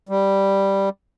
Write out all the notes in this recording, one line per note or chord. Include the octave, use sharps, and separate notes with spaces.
G3